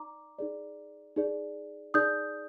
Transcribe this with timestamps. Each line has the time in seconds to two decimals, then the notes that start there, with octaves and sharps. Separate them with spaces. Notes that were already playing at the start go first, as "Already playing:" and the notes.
Already playing: D#4 D5 A#5 D6
0.39 D#4 G#4 D5
1.16 D#4 G#4 D5
1.94 D#4 G#4 D5 D#6 G6